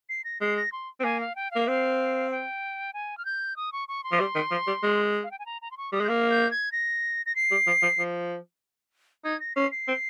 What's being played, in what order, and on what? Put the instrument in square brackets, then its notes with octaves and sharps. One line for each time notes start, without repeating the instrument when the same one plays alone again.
[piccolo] C7
A#6
[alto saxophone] G#3 [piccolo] C7
[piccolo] A#6
C6
[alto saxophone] C4
[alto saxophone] A#3 [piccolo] G#5
[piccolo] F5
G5
[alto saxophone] A#3 [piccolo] F5
[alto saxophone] C4 [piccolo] F5
[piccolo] G5
G#5
F6
G6
D#6
C#6
C#6
C6
[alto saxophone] F3
G3
D#3
F3
G3
G#3
[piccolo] F5
G5
G#5
A#5
A#5
C6
C#6
[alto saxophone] G3 [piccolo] D#6
[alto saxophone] G#3
[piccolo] G6
[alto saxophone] A#3 [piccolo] F6
[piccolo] G6
G#6
A#6
A#6
C7
[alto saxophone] G3
F3
F3
F3
[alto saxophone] D#4 [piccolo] G#6
[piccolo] A#6
[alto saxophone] C#4 [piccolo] C7
[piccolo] C7
[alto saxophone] C4